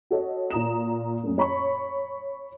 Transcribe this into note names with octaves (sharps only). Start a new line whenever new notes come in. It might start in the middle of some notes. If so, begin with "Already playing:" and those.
F#4 A4 C#5 D#5
A#2 A#5 D#6 E7
F#2 A3 A#3
C#5 B5 C#6